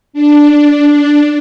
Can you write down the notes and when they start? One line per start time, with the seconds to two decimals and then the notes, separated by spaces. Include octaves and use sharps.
0.13 D4